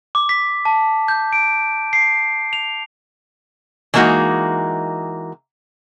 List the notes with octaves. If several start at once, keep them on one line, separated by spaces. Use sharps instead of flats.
D6
B6
A5
G6
D7
C7
F7
E3 G#3 A#3 D#4 F#4